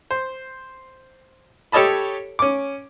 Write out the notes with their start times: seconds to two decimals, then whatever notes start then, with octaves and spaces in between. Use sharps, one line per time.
0.11 C5
1.72 G4 A4 C#5 D#5 A5 B5
2.39 C#4 D6